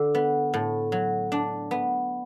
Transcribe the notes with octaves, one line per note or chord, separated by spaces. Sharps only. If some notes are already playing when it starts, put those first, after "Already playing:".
Already playing: D3
B3
A2
F#3
D4
B3